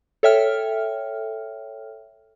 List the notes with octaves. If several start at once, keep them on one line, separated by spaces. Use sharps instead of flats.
A4 C#5 E5 G5 F6